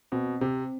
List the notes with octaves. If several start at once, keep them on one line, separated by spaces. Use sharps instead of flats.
B2 C4
C3 C4